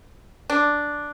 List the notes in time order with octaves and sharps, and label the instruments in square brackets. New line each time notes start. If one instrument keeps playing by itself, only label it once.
[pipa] D4